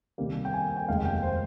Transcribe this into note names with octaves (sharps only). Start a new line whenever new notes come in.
C2 C3 D#3 G3 A#3
G5
G#5
G5
F1 D#2 C#3 G#3 F5
G5
C5